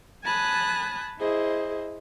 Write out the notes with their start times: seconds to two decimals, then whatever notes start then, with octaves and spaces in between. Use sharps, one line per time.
0.24 G#5 A5 B5 D#6 F#6
1.19 E4 G#4 C5 D#5